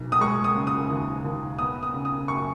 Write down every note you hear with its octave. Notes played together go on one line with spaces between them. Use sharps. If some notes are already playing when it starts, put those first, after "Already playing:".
Already playing: B1
D#6
G#3 C#6
D#6
C#3
D#6
D#2
D#2
B3 D#6
D#6
C#3
D#6
F#2 C#6